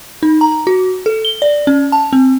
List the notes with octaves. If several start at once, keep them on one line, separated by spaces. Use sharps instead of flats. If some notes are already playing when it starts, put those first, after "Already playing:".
D#4
A#5
F#4
A4
G7
D5
C#4
A5
C4